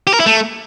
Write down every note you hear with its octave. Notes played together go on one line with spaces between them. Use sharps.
G4
A#4
E4
A3